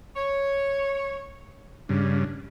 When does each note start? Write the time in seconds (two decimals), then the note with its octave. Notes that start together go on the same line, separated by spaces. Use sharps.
0.16 C#5
1.89 G2 C#3 D4